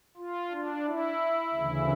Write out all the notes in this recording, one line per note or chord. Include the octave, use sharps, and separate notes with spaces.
F4
D4
E4
D2 C#3 E3